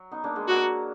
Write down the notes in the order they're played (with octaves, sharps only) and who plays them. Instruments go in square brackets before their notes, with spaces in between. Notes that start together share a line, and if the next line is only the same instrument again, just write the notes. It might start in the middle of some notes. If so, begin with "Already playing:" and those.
Already playing: [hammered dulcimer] F#3
B3 D#4
A#3 D4
G#3 B3
[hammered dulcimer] F#3 A#3 [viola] F#4